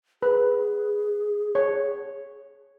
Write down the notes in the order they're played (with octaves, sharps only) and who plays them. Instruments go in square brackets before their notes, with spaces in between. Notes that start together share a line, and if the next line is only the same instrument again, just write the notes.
[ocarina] G#4 [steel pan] B4
[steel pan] C#5